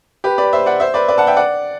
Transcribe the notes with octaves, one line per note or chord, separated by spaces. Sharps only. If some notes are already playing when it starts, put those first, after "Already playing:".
G4 B4
B4 D5
C5 E5
D5 F#5
C5 E5
B4 D5
B4 D5
F#5 A5
E5 G5
D5 F#5